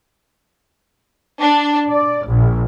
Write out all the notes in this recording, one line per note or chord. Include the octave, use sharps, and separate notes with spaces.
D4
D5
A#1